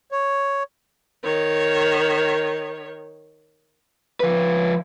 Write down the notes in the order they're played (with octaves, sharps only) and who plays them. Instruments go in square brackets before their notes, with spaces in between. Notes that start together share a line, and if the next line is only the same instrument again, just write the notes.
[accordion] C#5
[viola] D#3 C#5
[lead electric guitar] F3 B4